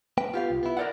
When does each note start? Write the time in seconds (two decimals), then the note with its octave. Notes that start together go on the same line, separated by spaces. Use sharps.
0.18 A#3 B4 G5
0.34 B3 F4 G4 F5
0.50 C2
0.63 B3 E4
0.77 A#4 D5 F#5